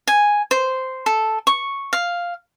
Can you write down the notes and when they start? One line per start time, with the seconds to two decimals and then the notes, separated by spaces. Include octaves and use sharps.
0.08 G#5
0.51 C5
1.06 A4
1.47 C#6
1.93 F5